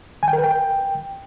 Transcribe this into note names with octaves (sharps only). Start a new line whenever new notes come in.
G#5
G5
A#4
B4
G5